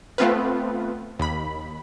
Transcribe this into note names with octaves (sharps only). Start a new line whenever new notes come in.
A3 B3 C4 F4 B4
D#2 B5